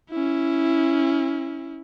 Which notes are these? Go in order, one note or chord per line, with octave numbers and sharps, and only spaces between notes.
C#4 E4